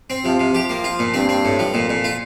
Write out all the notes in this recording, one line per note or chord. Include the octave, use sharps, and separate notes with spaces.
C4
C3 F3
C3
F3 G4
A#3
F4
A#2
G2 C4
C4
A2
F3
F2 A#2
A#2
F4